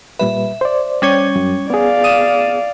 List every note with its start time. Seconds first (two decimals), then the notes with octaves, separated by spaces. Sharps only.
0.19 A#2 G3 B4 E5
0.61 C5 D5
1.02 G3 C#4 C#5
1.36 F#2
1.70 B3 G#4 D5 F5
2.04 D#6 D#7 E7